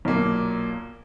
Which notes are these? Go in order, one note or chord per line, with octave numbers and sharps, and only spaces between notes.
B1 A#2 A#3